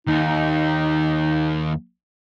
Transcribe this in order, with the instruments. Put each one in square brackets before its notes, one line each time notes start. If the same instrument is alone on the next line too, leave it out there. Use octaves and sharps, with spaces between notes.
[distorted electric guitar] D#2 [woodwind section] D#4